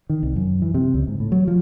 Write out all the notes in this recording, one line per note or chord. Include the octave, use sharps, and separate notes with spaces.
D#3
C2
F#2
E3
C3
C#2
G#2
A2
F#3
F3